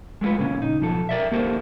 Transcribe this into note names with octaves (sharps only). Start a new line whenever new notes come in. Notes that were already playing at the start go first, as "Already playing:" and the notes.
G#3 A3 B3 F4 B4
D#2 A#2 C#3 C#4
D#4
B1 F3 A4
A#4 D5 E5
A#3 G4 A4 A#4 C5